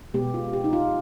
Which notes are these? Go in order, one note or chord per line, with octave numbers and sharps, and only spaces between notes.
B2 G#3 B3 G4
F4
G4
D#4
F4